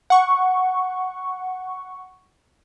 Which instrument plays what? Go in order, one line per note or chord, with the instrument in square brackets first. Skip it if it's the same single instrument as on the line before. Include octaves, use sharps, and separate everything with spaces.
[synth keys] F#5 C#6